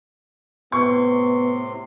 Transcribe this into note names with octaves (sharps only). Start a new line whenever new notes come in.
A2 C3 B3 C6 C#6